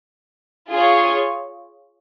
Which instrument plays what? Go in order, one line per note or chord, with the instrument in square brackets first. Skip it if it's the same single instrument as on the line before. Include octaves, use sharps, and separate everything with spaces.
[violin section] F4 G#4 C#5